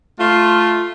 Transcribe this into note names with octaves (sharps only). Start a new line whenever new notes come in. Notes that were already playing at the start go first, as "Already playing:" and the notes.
A3 F4